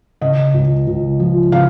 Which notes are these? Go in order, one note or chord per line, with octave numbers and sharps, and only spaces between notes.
C#3 D#5
C#2
C#2
F3
C#3 F5